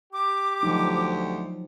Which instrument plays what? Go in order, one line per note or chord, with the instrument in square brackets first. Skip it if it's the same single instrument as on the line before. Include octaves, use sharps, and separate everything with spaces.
[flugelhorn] G4 [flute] D6
[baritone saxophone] D2 [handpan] F3 F#3 D#4